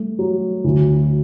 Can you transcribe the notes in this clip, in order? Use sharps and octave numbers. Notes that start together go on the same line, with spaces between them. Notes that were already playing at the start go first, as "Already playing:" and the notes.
Already playing: G3 A3
F#3
D2